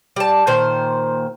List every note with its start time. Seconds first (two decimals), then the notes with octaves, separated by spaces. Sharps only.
0.16 G3 A5
0.47 A#2 D#3 C5